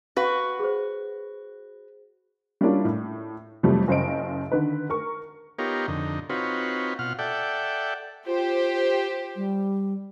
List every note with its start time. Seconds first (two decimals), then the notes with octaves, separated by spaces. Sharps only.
0.16 F#4 B4 F5
0.59 G#4 C5
2.61 G3 A#3 C#4 D4 E4 F4
2.85 A2
3.63 F2 C3 E3 F#3 G3 A3
3.88 F#1 C#3 C5 D#5 D7
4.52 D3 D#3 B4
4.90 A#4 C#6
5.59 B3 D#4 F4 G4 A#4 C#5
5.88 F2 D3 D#4
6.30 C4 D#4 F4 F#4 B4 C#5
6.99 B2 F4 F#5 F6
7.19 A4 D5 E5 F#5 G5
8.27 F4 G4 C5
9.36 G3